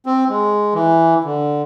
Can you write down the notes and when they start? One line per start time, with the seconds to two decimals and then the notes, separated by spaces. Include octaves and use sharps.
0.06 C4
0.29 G#3
0.74 E3
1.25 D3